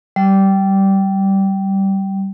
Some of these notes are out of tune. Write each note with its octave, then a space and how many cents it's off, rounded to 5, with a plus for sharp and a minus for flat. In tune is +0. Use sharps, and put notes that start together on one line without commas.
G3 -15